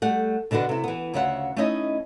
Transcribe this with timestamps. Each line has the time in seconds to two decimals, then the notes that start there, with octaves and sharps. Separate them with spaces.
0.02 G3 A3 F#5
0.51 B2 D3 D4 F#4 B4
0.69 C3 E4
0.84 E3 B3
1.14 D2 C#3 F4 C#5 E5 F#5
1.56 A3 C#4 D#4 E4 C#5 D#5